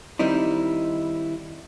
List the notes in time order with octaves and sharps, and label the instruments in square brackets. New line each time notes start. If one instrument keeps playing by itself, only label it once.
[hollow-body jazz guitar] D#3 G3 C4 D#4 E4